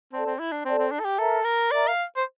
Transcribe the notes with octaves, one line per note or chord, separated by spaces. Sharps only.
C4 A4 D5 A5
C4
E4
D4
C4 A4 D5 A5
C4
D4
A4
G4
A4 A#4 E5 A#5
A#4
A#4 D5 E5 A#5
F5
C5